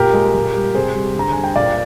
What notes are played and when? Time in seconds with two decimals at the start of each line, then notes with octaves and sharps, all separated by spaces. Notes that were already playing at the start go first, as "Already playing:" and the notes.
Already playing: A#2 G4 A#4
0.13 G#3
0.34 A#2
0.55 G3
0.74 C3 G#4 C5
0.95 G3
1.15 D3 A#5
1.32 G3 G#5
1.44 G5
1.56 A#2 D5 F5